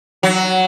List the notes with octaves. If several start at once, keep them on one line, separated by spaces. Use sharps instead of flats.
F#3